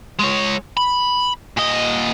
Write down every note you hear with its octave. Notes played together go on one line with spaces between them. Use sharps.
G#3 C#5
B5
A#2 D#5